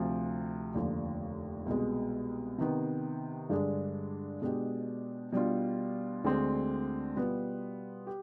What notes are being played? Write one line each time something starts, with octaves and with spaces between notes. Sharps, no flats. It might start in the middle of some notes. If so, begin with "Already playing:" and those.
Already playing: D2 C3 F3
F1 D#2 D3 F3
C2 B2 G#3
C3 D#3 B3
G2 D3 G#3 D4 G#4
B2 G#3 D4 G4
B2 G3 D4 F4
D2 D3 G#3 C4
B2 G3 B3 F4
G4